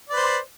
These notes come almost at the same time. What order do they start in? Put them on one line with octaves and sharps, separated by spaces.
D5 B4 C5